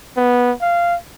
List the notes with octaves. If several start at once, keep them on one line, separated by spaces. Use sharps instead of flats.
B3
F5